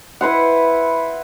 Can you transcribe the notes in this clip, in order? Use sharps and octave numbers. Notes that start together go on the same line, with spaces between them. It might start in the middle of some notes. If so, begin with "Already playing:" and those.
E4 B4 C5 F#5